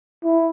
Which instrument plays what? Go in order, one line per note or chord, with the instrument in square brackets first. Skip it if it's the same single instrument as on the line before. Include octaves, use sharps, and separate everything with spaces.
[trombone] E4